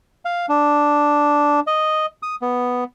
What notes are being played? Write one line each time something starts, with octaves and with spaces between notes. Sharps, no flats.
F5
D4
D#5
D#6
B3